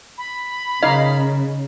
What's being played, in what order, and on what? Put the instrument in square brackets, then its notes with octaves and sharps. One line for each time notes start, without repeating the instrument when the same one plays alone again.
[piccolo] B5
[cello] C#3 [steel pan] D#4 F5 [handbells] D#5